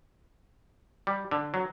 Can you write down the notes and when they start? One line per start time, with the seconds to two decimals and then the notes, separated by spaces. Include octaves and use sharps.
1.07 G3
1.31 D3
1.54 F#3